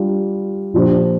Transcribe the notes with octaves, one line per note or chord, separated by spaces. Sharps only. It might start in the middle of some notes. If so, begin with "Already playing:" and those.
Already playing: G3 D4 F4 D5
A#2 F3 D4 G4 C5